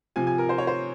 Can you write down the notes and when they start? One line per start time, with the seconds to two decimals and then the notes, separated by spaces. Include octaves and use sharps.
0.16 C3 F3 G#5
0.27 G#5
0.38 A#4
0.49 C5
0.58 C#5
0.67 C5